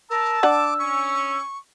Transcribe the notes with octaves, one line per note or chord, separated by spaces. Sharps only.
A#4 A5 E6
D4 F#5 D6
C#4 C#6